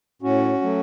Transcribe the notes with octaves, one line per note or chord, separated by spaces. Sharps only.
A2 C#4 F#4
F#3 A3